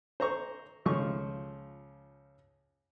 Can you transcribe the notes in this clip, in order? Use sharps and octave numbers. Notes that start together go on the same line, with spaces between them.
C5 A#5 C#6
C#2 F3 C#6